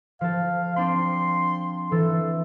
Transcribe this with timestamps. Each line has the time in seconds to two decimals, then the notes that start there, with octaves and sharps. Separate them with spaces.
0.21 F3 A4 F5
0.77 C4 D4 C6
1.92 E3 A4